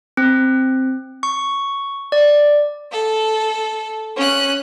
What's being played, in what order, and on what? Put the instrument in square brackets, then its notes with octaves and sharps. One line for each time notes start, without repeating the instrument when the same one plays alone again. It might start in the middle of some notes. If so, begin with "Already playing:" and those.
[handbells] C4
C#6
D5
[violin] A4
C#4 F#6